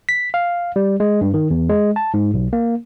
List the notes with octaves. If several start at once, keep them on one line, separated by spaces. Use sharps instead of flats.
B6
F5
G3
G#3
G2
D#3
E2
G#3
A5
G#2
B1
A#3